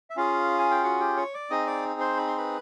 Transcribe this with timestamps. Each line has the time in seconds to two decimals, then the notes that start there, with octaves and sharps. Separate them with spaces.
0.10 E5
0.16 C#4 F4 G#4 F5
0.59 G#5
0.71 G5
0.83 F#4 F#5
1.00 G4 G5
1.17 C#5 C#6
1.34 D5 D6
1.50 C4 D#4 G#4 D#5 D#6
1.67 D5 D6
2.00 C5 C6
2.17 B5
2.27 C6
2.38 B4 B5